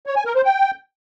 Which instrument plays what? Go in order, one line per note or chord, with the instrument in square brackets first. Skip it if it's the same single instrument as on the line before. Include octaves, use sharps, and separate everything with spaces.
[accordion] C#5
G#5
A#4
C5
G5